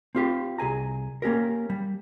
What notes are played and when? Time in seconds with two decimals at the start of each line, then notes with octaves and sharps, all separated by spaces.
0.15 C4 F4 G4
0.58 C2 G#4 G#5 A#5
1.22 A#3 C#4 G4 A#4
1.70 G3